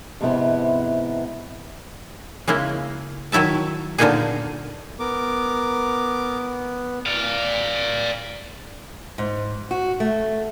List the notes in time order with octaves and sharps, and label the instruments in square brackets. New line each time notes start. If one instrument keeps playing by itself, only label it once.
[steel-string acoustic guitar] F2 G#2 C3 B3 E4
[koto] C#3 G#3 A#3 E4
D#3 F#3 E4 E5 A5
A#2 D3 A#3 B3 D#4 G#4
[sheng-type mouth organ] B3 [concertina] A#4 D6
[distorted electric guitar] D5 F5
[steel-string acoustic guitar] G#2
F#4
A3